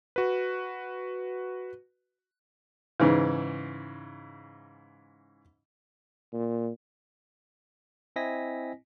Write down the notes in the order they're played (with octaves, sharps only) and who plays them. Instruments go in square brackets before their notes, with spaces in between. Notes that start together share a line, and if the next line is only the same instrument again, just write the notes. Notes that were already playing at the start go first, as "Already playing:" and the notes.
[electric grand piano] F#4 B4
[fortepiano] G#2 C#3 E3
[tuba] A#2
[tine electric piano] C4 E4 D#5 G#5 A#6 B6